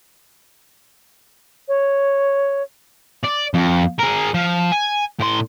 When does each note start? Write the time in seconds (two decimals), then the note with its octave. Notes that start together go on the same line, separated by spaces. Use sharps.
1.68 C#5
3.24 D5
3.54 F2
3.99 G#4 A#4
4.34 F3
4.72 G#5
5.20 A2 C6